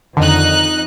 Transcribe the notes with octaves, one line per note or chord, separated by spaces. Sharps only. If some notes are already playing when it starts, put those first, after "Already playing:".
F2 D3 D#3 D#4 F#6